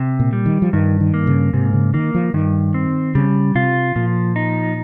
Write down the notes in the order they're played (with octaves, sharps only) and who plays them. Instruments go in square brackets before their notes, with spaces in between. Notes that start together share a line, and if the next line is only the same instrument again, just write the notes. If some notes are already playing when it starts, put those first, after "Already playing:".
Already playing: [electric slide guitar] C3
[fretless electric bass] A#2
[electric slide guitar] G3
[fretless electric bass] D#3
F3
[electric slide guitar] G2 [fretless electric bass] D#3
[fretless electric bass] D#3
[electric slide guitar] A#3
[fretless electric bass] C#3
[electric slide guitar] G#2 [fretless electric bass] C3
[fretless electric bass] C#3
[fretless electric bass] D#3 [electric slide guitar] A#3
[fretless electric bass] F3
[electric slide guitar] G2 [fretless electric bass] D#3
[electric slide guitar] C4
[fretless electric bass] C#3 [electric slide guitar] G3
[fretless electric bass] C3 [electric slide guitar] F4
[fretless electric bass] A#2 [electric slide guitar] F3
[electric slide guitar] D#4